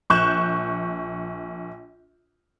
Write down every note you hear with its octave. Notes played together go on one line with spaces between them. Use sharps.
A#1 C#6 F#6 G6 E7